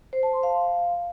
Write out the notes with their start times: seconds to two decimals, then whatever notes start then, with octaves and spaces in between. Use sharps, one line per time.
0.13 C5
0.23 A5
0.33 C6
0.43 F5